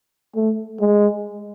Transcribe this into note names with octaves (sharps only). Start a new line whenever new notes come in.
A3
G#3